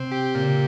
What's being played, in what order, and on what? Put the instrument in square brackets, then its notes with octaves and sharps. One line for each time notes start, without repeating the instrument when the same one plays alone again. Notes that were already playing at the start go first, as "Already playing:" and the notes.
Already playing: [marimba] C3 [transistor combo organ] C4
[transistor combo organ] G4
[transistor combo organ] A#2 [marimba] C#3